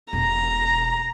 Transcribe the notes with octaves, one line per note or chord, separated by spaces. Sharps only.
E1 B2 A#5